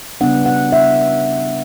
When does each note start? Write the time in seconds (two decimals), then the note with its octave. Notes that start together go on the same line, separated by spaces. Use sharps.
0.21 C#3 G3 B3 D4 F#5
0.46 F#5
0.72 E5